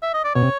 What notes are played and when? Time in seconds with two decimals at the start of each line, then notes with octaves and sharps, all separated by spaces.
0.03 E5
0.14 D#5
0.24 D5
0.35 B2 C#5
0.42 C3